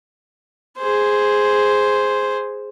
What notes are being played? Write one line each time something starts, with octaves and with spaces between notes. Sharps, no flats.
G#4 C5